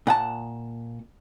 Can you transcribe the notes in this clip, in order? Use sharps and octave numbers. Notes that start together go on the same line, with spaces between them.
A#2 F#5 A5